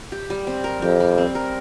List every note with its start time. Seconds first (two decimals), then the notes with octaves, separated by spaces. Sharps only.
0.12 G4
0.30 G3
0.47 C4
0.64 A#4
0.82 F2 G4
1.00 G3
1.18 C4
1.35 A#4